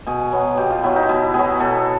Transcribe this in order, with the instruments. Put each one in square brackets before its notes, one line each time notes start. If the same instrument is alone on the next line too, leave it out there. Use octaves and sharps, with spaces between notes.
[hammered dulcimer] B2 G#4
F#3 B3
B2 G4
F4
F#3 B3 E4
D#4
B2 E4
F#3 B3 G#4
B2 A4